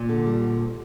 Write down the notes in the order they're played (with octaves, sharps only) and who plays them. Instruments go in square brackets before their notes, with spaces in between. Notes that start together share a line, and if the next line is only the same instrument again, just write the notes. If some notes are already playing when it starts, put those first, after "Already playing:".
Already playing: [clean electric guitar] A#2
[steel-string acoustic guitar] D3
G3
D2